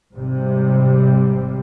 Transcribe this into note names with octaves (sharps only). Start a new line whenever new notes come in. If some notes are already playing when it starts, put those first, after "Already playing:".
G#1 C3 G3